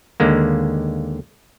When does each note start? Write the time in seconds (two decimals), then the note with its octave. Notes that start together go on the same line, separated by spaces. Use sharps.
0.20 D#2 D3 G#3 A#3